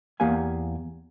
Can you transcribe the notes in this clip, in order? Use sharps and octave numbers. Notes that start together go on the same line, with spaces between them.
E2 A#3 G4 F5 G#5